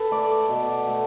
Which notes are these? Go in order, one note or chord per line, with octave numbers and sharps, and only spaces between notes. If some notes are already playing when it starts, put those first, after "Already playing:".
Already playing: A4 B4
A3 D5
B2
A3